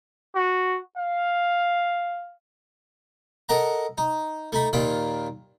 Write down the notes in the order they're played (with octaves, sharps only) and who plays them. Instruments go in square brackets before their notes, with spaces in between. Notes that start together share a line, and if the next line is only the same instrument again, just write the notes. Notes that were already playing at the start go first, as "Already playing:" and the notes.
[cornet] F#4
F5
[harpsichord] A4 A#4 D#5 F#5 A#5
D#4
A3 D#4 B5
D#2 A#2 D#3 F4 B5